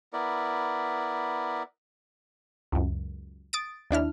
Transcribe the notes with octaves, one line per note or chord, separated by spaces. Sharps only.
B3 E4 A#4 D5
C#2 F#2
D#6 A6 D7
D#2 D4 E4 F6